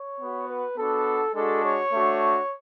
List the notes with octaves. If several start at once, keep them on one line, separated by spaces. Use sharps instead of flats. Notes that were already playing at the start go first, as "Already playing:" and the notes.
Already playing: C#5
B3 F#4
B4
B3 D4 F#4 A4
G#3 D4 F#4 A4
C#5
A3 D4 F#4